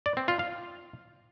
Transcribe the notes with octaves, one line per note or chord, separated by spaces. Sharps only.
D5
C4
F4
F5